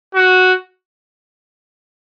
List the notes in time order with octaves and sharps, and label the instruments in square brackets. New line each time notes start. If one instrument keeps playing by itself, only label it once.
[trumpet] F#4